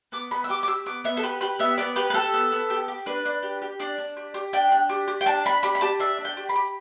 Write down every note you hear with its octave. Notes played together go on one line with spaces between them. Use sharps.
B3 D6
B3 B5
E6
G4 D6
D6
G4 E6
B3 D6
B3 E5
A4
G4 B4
G4 B4
B3 E5
B3 D5
G4 B4
B4
G4 A4
B3
B3
G4
G4
D4 B4
D4
G4
G4
D4 D5
D4
G4
G4
D4 G5
D4
G4
G4
G5
D4 A5
D4 B5
G4 B5
B5
G4 A5
D4 E5
D4
G5
G4
B5
G4